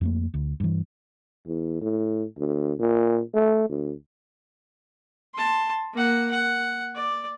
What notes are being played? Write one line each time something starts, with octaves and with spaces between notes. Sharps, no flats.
F2 A3 A#3
D2
G2 E3
E2
A2
D2
A#2
A3
D2
A5 C6
A#3 F#5
F#5
D5